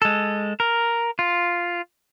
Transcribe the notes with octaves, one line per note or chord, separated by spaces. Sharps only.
G#3 A4
A#4
F4